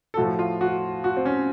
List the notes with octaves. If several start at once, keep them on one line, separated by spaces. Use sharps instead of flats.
A4
A2 F3 F#4
F4
F#4
F#4
C4
C#4